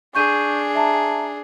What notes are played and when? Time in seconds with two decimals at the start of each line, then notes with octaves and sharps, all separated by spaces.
0.15 D4 G#4 C#6 G6 D#7
0.75 E5 A5 A#5